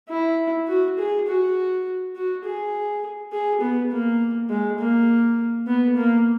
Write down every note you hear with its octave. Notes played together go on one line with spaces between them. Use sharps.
E4
F#4
G#4
F#4
F#4
G#4
G#4
B3
A#3
G#3
A#3
B3
A#3